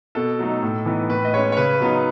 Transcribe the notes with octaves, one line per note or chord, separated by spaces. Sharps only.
B2 A4
F#3 A3 D#4
A2
E3 B3 D#4
A2 B4
D#5
G#3 C#4 C#5
C#5
C#3 B4
F#3 B3 D#4